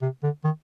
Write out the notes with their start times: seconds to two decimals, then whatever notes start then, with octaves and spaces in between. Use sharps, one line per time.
0.02 C3
0.23 D3
0.44 D#3